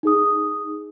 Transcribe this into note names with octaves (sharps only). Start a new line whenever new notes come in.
D#4 G#4 D#6